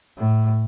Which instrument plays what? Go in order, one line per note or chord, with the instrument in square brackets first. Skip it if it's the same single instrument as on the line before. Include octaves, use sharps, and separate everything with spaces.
[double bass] A2